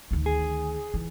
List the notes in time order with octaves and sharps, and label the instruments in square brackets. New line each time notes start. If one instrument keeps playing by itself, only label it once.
[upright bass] D2 D#3
[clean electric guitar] G#4
[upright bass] E3